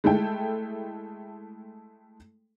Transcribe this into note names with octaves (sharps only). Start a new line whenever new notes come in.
G#3 A3 E4 A4 G5